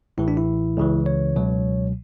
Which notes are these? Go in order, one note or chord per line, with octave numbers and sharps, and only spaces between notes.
A1 A2 E3 E4
D4
E4
C#2 C#3 E3
C#5
C#2 B2 F#3